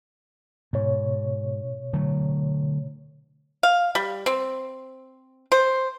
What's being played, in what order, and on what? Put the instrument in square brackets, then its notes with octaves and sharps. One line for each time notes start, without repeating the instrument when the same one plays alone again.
[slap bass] G#2 [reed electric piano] B2 C#5
[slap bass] D3 F#3 A3
[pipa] F5
G3
C4
C5